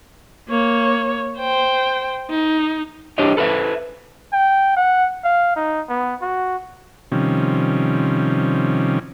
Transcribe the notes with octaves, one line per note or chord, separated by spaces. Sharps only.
A#3 C#5
C5 G5
D#4
D4 G4 C5 C#5 D#5
A4 B4 C5 E5
G5
F#5
F5
D#4
B3
F#4
C3 D#3 F3 G3 C#4